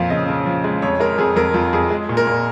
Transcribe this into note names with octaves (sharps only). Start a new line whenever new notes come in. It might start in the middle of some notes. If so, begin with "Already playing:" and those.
Already playing: F2 A#2 F3 F5
C#3 D#5
C#3
F3
G#3
F2 C#5
G#3 A#4
F2 G#4
F2 A#4
F2 F4
F2 G#4
G#3
A#2
A#4
A#2